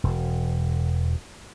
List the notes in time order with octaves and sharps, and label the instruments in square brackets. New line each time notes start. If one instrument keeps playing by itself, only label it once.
[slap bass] E1